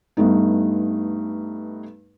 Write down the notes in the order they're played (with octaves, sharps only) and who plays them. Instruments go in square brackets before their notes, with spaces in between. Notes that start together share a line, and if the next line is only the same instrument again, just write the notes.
[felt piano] G2 A3 B3 D#4